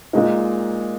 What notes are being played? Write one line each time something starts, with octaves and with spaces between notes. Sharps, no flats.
A#2 G#3 D#4